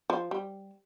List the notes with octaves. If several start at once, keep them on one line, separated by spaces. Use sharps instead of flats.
F3
G3